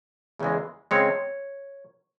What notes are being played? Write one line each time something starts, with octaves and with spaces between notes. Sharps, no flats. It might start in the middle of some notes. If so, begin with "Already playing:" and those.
E2 C#3 E3 G#3
C#3 G#3 C4 C#5